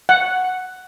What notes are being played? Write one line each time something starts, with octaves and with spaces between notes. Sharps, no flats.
F#5